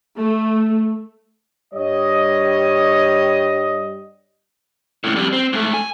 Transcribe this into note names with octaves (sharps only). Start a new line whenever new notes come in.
A3
G2 G3 C#5 D#5
C#2 A2
F2 G3
C4
G#2 A3
G#5